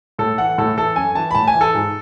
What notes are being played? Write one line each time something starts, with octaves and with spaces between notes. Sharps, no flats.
A2 A4
E3 F#5
A2 A4
E3 A4
F#2 G#5
E3 A5
B5
A2 A5
G#5
E3
A4
G#2